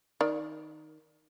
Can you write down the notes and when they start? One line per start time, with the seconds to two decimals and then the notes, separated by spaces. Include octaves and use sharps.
0.21 D#3 D5